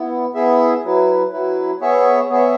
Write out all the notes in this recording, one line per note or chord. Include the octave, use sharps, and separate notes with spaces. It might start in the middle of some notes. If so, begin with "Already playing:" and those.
Already playing: B3 E4
B3 E4 G#4 E5
F#3 E4 B4
F#3 E4 B4
B3 G#4 C#5 E5
B3 G#4 C#5 E5